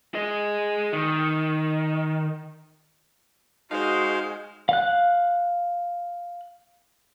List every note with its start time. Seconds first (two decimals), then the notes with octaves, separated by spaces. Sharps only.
0.15 G#4 D#5
0.93 D#3
3.71 G#3 D#4 F#4 C5 F5
4.69 F5 F#6